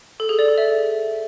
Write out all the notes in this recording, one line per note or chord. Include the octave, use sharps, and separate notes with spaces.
A4
G#4
D5
A4
E5